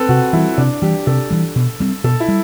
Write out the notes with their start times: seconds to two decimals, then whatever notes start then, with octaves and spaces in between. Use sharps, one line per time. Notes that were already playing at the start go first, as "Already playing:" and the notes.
Already playing: C4 A4 B4
0.09 C3 F#4
0.33 E3 G3 E4
0.58 C3 D4
0.82 E3 G3 G4
1.07 C3 A4
1.31 E3 G3
1.56 B2
1.80 G3 C4
2.04 B2 A4
2.20 E4
2.28 G3